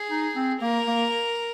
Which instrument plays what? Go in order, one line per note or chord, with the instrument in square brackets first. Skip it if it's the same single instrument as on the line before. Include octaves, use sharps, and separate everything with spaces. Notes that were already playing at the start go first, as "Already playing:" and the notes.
Already playing: [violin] G#4
[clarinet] D#4
C4
[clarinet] A#3 [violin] A#4
[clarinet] A#3